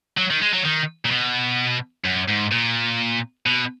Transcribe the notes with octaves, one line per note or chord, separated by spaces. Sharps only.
F#3
D#3
G#3
F#3
D#3
A#2
B2
F#2
G#2
A#2
B2